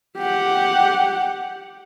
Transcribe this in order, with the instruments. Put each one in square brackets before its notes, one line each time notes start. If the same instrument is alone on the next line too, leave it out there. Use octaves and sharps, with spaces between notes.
[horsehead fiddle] G4 F#5